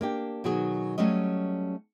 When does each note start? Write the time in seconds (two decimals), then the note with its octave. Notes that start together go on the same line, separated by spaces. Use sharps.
0.01 A#3 D4 G4
0.44 B2 D#3 F#3 F#4 G#4
0.98 F#3 G3 A3 C#4 D#5